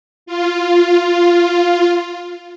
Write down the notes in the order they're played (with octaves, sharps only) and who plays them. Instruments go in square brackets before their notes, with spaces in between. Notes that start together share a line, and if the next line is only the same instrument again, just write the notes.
[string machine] F4